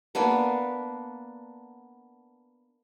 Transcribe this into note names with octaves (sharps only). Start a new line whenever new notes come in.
A#3 B3 D4 B4